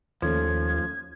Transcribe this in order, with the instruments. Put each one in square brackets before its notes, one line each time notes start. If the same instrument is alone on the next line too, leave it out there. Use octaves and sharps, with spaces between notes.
[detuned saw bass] D#2 [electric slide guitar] F3 [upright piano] A3 C#4 [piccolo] G#6